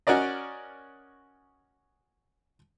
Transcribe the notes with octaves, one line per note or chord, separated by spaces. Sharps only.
C#4 F#4 A#4 D5 D#5